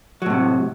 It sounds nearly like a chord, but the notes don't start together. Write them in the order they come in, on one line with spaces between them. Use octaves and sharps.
F#3 A2 C3